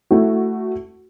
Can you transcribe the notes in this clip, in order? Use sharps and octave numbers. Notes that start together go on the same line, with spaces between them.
A3 E4 F#4